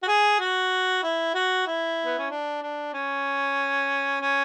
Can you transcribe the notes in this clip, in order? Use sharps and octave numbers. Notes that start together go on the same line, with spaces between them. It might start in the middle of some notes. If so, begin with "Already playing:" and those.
F#4
G#4
F#4
E4
F#4
E4
B3
C#4
D4
D4
C#4
C#4